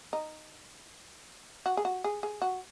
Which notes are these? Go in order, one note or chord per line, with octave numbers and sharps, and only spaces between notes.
D#4
F#4
G#4
F#4
G#4
G#4
F#4